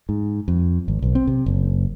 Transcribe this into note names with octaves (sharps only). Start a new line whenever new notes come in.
G#2
F2
G#1
B1
C4
C3
F#1